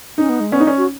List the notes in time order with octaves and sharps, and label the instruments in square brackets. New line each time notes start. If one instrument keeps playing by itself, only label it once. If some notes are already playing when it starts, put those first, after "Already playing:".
[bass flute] C#4 [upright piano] D#4
[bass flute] B3
G#3
[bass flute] B3 [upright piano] C#4
[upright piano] D#4
C#4
[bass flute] F#4